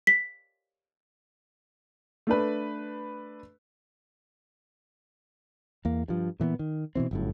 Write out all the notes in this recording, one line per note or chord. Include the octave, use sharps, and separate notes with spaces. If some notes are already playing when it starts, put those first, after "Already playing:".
B6
A3 D4 B4
E2 A#3
G2 F3
A#2 E3 A#3 B3
D#3
B2 D#3 E3 C4
G1 F#2 A2